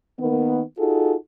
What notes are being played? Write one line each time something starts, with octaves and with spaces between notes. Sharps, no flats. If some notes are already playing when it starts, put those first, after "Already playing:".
D#3 A#3 B3
D#4 F4 F#4 G#4 A4